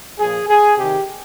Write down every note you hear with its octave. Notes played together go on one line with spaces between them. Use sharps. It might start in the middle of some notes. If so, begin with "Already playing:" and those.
A#2 F3 G#4
G#4
C3 D#3 G4